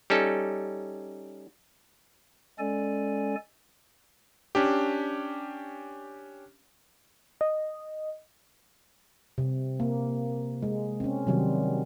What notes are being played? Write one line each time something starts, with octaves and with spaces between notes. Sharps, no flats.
G3 C#4 D#4 A4
G#3 C#4 A4 D5 G#5
C#4 D4 G4
D#5
C3
A#3
G#3
C4 C#4
C3 D#3 F#3 G3 C4